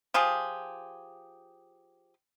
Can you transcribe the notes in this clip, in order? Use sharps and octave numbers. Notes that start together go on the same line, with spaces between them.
F3 F4 G4 G#4